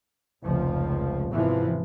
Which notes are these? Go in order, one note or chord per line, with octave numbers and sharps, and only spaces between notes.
F1 C#2 F3
G#1 E2 C3 E3 F3